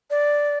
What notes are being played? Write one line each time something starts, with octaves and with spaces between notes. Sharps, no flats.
D5